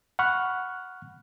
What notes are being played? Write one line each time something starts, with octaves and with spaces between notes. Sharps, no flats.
F#5 B5 C#6 F6 F#6